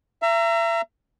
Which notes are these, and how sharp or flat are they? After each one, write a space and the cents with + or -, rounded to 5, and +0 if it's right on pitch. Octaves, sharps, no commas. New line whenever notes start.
E5 +35 A#5 -10